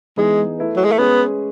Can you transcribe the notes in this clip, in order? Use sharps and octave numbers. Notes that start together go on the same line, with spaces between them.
E3 G#3 B3 D#4 G#4
A3 E4 B4
F#3
G#3
A3
G#3 B3 C#4 G#4 B4